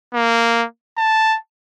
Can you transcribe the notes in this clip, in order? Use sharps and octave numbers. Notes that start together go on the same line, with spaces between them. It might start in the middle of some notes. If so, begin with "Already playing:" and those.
A#3
A5